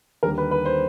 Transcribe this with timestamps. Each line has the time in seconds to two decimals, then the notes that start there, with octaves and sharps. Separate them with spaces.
0.23 D#2 D3 G3 A#3 A#4
0.38 B4
0.51 B4
0.65 C5